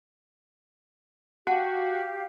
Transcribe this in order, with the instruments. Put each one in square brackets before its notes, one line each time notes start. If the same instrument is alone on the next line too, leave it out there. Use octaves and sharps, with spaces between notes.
[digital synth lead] F#4 [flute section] G4 F5 [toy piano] F#5 A5